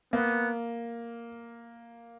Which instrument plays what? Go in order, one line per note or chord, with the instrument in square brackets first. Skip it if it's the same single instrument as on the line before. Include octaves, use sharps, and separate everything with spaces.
[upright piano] A#3 [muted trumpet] B3